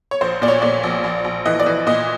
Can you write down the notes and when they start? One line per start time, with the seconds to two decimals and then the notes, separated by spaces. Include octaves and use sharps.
0.11 C#5
0.21 A#1 C5
0.42 A#2 D5
0.48 C#5
0.62 A#2 D5
0.84 A#1
1.04 A#1
1.24 A#1
1.46 E3 D#5
1.60 D5
1.66 E3
1.87 A#2 D#5